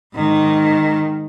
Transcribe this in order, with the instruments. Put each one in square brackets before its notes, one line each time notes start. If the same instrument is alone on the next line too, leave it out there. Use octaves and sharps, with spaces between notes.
[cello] G#2 D#3